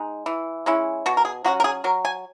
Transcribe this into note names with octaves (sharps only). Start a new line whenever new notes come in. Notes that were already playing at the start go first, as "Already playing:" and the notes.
Already playing: G#3 D#4
E3
G#3 C#4 E4
B2 F#4
A#4
G#4
F#3 C#4 F#4
A#4
G#4
F#3 A#4
G#5